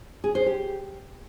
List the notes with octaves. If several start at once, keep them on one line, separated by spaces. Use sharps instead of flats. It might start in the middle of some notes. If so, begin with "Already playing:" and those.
G#4
C5
G4